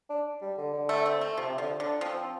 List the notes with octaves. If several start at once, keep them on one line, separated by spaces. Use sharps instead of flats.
D4
G3
D3
D3
A3
C4
A3
C3 F3
C3
D3 F3
D3 D4
F3 C4
C4